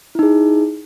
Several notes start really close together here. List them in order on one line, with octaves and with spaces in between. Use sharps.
E4 D#4 G#4